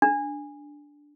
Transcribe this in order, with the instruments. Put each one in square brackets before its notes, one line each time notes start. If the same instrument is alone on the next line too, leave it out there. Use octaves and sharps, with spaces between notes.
[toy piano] D4